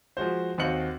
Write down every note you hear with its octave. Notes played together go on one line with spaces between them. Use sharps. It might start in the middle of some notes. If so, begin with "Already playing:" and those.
F3 G#3 F#4 C5
D#2 C4 F#4 D#5 C#7 F#7